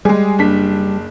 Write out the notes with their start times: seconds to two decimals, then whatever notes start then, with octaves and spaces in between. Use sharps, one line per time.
0.05 G3 G#3 G#4
0.38 F#1 D4 B6